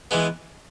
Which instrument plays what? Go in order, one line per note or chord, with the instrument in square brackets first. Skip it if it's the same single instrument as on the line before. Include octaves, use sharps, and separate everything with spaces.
[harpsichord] E3 G#3 B3